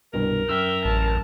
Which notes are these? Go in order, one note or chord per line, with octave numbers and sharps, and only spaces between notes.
C2 G2 B2 A#4
F#2 E5 G5 E6 F6
A1 A5